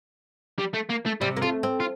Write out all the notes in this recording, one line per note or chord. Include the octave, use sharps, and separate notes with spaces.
G3
A3
A#3
A3
C3 G3
A#3
A3 F4
C4
F4